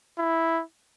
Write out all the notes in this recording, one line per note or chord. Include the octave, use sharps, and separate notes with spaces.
E4